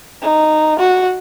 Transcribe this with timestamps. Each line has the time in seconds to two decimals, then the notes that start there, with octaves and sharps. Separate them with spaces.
0.22 D#4
0.80 F#4